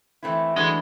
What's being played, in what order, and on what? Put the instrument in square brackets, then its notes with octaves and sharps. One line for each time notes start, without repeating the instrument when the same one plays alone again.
[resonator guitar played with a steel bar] E3 A3 C4 E4
[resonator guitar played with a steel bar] E3 A3 D4 F#4 [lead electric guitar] G#3